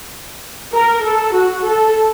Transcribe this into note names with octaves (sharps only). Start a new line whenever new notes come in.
A#4
A4
F#4
A4